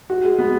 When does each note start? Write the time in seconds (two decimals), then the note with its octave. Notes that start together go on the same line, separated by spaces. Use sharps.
0.10 F#4
0.24 G#3
0.39 B3